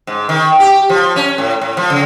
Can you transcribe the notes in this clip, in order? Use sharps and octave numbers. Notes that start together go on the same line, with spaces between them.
G#2
D#3
G4
F3
C#4
A2
A2
F3
C#3